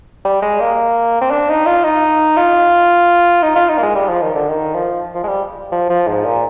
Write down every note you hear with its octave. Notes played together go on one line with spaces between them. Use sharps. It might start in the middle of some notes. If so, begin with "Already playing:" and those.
G3
G#3
A#3
C4
D4
D#4
F4
D#4
F4
D#4
F4
D#4
A#3
G#3
G3
F3
D#3
D3
D#3
F3
F3
G#3
G3
F3
F3
G#2
A#2